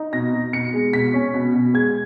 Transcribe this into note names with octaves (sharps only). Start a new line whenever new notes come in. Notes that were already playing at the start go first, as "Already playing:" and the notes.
Already playing: D#4
B2 A#6
B2
B2 C#7
G#3
B2 B6
C#4
B2
B2
G#3 G#6